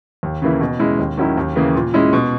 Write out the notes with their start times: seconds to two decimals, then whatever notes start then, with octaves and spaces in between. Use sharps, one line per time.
0.23 D#2
0.42 C#3 E3 A#3 E4
0.60 B2
0.79 G#3 C#4 E4
0.99 D#2
1.18 D#3 F#3 C#4 E4
1.38 D#2
1.56 C#3 E3 A#3
1.75 A#2
1.94 G#3 C#4 E4
2.13 B2